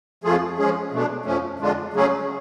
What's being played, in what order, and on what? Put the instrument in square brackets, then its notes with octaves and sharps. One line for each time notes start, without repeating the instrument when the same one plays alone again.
[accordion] F2 F3 A3 F4 G#4
F3 G#3 C#4 G#4
B2 A3 D4
F2 F3 A3 C#4
F2 D3 G#3 D4 F4
C#3 F#3 A3 C#4 G#4